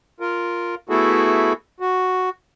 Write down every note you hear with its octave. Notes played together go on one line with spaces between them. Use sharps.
F4 A#4
A3 B3 E4 F#4 G#4 A4
F#4